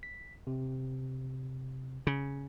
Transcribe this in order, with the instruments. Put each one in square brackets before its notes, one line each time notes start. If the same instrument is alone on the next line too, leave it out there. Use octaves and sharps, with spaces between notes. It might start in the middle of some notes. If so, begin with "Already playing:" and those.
[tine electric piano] B6
C3
[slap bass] C#3